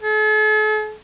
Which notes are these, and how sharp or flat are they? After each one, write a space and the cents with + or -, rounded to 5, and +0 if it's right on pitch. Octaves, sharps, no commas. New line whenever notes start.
A4 -45